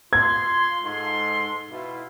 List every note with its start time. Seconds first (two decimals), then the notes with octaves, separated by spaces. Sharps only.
0.13 F4 C6 G#6
0.84 G#2 A4 C6
1.71 B2 E4 F4